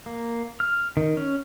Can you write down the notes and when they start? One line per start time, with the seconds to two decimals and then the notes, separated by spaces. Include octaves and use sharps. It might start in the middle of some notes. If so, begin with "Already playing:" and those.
0.06 A#3
0.60 F6
0.97 D#3
1.17 C#4